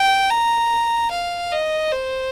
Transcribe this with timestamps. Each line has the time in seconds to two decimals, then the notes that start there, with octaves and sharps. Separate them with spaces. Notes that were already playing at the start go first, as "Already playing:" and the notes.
Already playing: G5
0.30 A#5
1.11 F5
1.52 D#5
1.92 C5